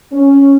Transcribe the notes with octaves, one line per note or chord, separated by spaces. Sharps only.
C#4